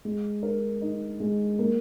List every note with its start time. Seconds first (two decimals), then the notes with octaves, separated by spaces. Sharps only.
0.05 G#3
0.43 A#4
0.82 D#4
1.20 G#3
1.59 A#3